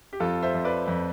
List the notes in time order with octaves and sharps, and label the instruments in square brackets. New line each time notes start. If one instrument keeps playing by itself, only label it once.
[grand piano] G4
F2 F4 A4
C5 E5
F2
B4 D5
F2